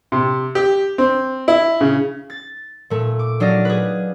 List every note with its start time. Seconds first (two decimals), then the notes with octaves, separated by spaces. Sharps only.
0.12 C3
0.55 G4
0.98 C4
1.48 E4
1.81 C#3
2.30 A6
2.90 A#2 A3
3.19 D6
3.40 F#3 D4 D5 D#5 F5
3.65 G#4 B4